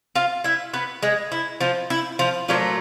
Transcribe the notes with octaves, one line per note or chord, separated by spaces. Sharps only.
F4 F5
E4 E5
B3 B4
G#3 G#4
E4
F3 F4
E4
F3 F4
A#2 F3 F#3 A3 F4